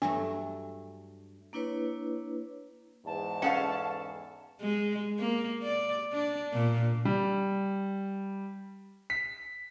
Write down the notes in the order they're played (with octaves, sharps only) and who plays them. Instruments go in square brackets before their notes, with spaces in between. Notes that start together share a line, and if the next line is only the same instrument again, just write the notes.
[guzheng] G2 F#3 A3 [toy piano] D4
[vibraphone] A#3 D4 E4 B4 C#5
[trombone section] E2 G#2 [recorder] A5
[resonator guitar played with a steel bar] C#4 A4 F5 [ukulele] F#5
[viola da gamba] G#3
A#3
D5
D4
A#2
[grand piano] G3
B6